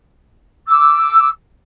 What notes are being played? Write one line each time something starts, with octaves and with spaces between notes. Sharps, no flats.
D6 E6